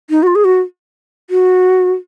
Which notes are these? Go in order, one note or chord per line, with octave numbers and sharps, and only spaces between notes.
D#4
F#4
F4
G#4
F#4
F#4